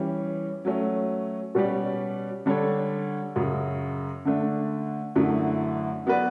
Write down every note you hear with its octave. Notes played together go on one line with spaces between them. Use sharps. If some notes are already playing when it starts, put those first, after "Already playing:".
Already playing: E3 G3 C#4 G4
F#3 A3 C#4
B2 G3 C#4 G4 D5
D3 G3 D4 A4 C#5
F#2 C#3 F#3
D3 A3 D4
F#2 D3 F#3 A3 E4
F#3 B3 F#4 B4 D5